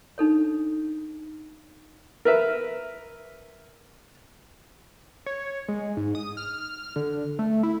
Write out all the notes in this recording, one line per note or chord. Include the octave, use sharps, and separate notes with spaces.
D4 D#4 A4 C#5
A#4 B4 E5
C#5
G#3
G#2
D#6
F6
D3
A3
E4